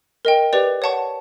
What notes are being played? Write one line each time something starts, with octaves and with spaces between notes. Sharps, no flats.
A#4 D#5 G5
G4 B4 D5
C#5 F#5 A5 C#6